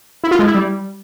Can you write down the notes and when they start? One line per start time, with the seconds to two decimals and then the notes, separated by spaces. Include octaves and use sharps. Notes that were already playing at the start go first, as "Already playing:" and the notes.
0.24 E4
0.31 F4
0.39 G#3
0.47 E4
0.54 G3